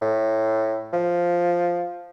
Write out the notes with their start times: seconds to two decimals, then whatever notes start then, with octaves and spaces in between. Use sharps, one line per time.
0.01 A2
0.93 F3